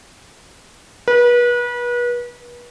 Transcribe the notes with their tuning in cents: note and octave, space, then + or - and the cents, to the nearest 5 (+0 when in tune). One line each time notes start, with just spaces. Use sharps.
B4 -35